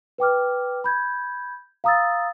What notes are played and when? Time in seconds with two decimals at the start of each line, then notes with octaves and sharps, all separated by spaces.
0.18 B4 G5 D6 F6
0.84 B5 G6 G#6
1.84 F5 A#5 D#6 E6 A6